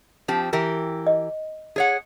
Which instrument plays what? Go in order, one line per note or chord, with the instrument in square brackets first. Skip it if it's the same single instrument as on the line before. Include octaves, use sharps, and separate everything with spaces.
[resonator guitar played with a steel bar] F3 C4 G4
E3 G4 A#4
[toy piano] D#5
[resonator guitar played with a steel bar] G#4 C#5 F#5